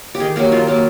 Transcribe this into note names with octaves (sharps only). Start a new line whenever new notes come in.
G4
D#3 G#4
F#3 A#3 G4
D#3 F4
F#3 A#3